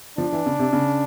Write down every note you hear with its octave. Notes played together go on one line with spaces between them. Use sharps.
F3 D4
E3
C#3
C3
C#3